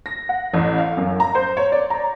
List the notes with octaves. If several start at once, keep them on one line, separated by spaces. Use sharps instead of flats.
A#6
F#5
A1
F5
F#2
A#5
C5
C#5
D5
A#5